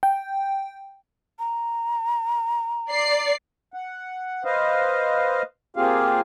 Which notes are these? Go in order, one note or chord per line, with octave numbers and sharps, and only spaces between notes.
G5
A#5
D5 C7
F#5
B4 C5 D#5 F5
A#3 C4 F4 G4 G#4 F5